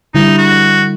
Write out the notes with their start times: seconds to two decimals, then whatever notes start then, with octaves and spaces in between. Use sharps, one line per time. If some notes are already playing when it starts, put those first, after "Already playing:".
0.15 D3 G3 D#4 E4
0.38 F#4